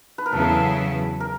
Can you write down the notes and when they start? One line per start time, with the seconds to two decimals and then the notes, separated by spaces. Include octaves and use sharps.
0.18 B4
0.26 A#4
0.33 E2 C#3 F#3 B3 E4 A4
1.20 A#4